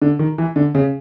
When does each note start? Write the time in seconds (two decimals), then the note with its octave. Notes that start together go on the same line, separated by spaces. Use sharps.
0.02 D3
0.19 D#3
0.38 E3
0.56 D3
0.75 C#3